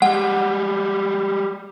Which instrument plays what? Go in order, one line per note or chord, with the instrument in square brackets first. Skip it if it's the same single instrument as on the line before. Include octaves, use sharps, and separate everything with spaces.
[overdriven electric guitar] G3 G#3 [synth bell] F#5